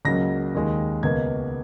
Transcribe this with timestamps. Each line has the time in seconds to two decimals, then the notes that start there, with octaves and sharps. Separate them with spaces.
0.05 C#2 C#3 F#3 A#3 A#6
0.55 D#2 D#3 G#3
1.03 C#2 B2 A#3 G#6